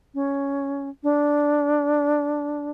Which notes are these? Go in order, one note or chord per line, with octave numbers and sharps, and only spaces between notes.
C#4
D4